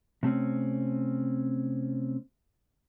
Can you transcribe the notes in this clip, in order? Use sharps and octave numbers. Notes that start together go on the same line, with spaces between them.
C3 A3 C4 C#4